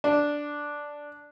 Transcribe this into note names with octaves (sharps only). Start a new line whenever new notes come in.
D4